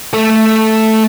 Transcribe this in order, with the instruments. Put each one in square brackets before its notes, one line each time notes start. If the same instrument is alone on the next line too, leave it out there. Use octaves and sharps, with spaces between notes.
[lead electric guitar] A3 A4